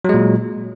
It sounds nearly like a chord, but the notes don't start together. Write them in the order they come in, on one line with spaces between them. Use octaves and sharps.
F#3 G#3 A#2